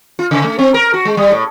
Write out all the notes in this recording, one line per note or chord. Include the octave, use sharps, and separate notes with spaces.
F4
C#3
A3
C4
A#4
F#4
G#3
G3
A2